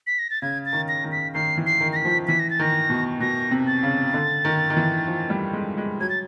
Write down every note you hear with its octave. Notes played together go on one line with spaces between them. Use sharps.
B6
A#6
A6
C#3 G#6
A6
D#3
A#6
D#3
B6
D#3 C7
E3
C7
D#3
A#6
B6
F3
E3 B6
A#6
A6
D#3 A#6
B2
B2 A#6
C3
A6
C#3
D3
D#3
D#3
E3
F3
G3
G#3
G#3
F#3 G#6
A6